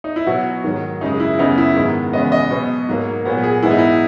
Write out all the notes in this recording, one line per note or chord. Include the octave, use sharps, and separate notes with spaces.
D#4
E4
B2 F#3 B3 F#4
G#2 D#3 F#3
F#2 C#3 G#3 D#4
E4
F#2 C#3 G#3 B3 D#4
E4
G#2 D#3 G#3 B3
E2 C#3 G#3 B3 D#5
D#5
B2 F#3 B3
G#2 F#3 A#3
A#2 F#3 B3
G#4
G#2 E3 G#3 B3 E4
D#4
E4